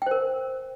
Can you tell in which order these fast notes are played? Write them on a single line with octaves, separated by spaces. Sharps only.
G5 C5 A#4